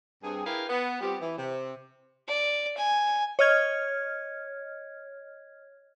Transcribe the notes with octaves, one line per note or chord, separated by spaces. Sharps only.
G2 C4 G#4
E4 G4 G#4 A#4 B4 F5
B3
G3 B3 C4 F4 G4
E3
C3
D5
G#5
C#5 D#5 F6 G#6